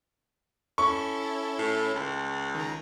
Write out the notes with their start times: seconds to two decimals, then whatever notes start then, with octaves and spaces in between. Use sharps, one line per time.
0.78 C#4 E4 A4 C#6
1.59 A2
1.95 C#2
2.55 D#3 A#5